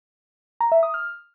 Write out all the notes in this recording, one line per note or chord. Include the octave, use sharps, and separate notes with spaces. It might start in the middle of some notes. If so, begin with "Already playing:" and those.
A#5
E5
D#6
F6